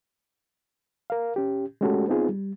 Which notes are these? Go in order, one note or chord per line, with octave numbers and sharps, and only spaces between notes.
A#4 F5
C#4 G4
G#3 A3 C#4 F#4 G4 A4
B3 C4 D#4 F4 G#4
G3